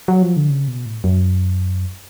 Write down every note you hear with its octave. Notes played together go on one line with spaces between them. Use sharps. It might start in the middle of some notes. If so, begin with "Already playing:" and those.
F#3
F3
D3
C#3
B2
A2
F#2